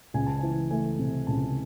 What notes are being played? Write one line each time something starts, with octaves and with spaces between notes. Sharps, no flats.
C#2 G#5
A5
E3 G#5
A3 G#5
C3
C#2 A5